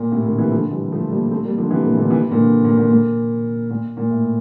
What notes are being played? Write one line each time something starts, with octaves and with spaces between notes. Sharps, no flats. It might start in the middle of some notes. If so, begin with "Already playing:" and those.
Already playing: A#2
A2 C3
A#2 D3
C3 E3
D3 F3
E3 G3
F3 A3
G3 A#3
A3 C4
G3 A#3
D3 F3
C3 E3
A#2 D3
A#2 D3
C3 E3
A#2 D3
A#2
A#2
A#2
A#2
A#2
A2